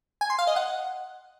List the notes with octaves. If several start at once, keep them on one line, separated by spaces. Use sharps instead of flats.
G#5
C6
F5
D#5
F#5